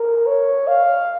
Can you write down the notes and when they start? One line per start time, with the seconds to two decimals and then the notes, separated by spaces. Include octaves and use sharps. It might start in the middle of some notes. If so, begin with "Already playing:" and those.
Already playing: A#4
0.26 C#5
0.68 F5